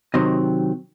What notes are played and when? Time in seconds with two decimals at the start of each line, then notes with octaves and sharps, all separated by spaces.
0.14 C3 D#3 F#3 C4 D#5